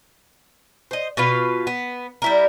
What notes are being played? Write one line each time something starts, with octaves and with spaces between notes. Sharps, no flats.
C5 D#5
B2 F4 B4 F5
B3
G3 E4 A#4